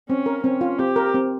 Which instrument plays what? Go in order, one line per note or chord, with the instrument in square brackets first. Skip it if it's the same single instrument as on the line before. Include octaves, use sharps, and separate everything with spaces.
[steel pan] C4 [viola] C#4
[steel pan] A#4
[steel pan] C4 [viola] C#4
[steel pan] F4
[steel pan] C4 [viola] G4
[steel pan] A#4
C4